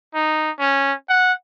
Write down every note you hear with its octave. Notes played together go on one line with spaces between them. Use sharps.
D#4
C#4
F#5